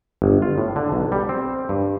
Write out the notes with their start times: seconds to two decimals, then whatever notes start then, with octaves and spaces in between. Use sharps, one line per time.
0.22 G1
0.42 F4
0.58 A2
0.76 D3
0.92 B1
1.12 G3
1.29 C4
1.69 G2